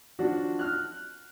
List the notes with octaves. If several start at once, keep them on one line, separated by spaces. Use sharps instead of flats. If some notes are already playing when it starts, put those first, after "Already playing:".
F3 D4 F#4
F6 F#6